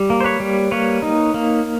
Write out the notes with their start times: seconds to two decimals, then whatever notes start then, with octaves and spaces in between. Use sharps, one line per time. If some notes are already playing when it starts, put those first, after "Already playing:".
Already playing: G3
0.10 A#3
0.21 C5
0.24 B4 C#5
0.40 G3
0.71 A#3 B4 C#5
1.02 D#4
1.34 A#3